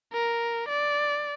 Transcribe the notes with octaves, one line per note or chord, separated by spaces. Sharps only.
A#4
D5